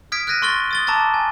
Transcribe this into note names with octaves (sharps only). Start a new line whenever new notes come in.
D#6 F6 G#6 B6 D7
F6 F#6 G#6 A#6 B6 D#7
C6 C#6 F6 A6 A#6 G7
D#6 A6 G7
A5 A#5 D6 E6 A6
G#5